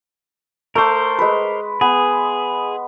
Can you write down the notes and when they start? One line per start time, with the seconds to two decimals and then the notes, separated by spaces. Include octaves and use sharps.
0.75 A3 A#4 C5 D6
1.19 G#3 B4
1.81 B3 G#4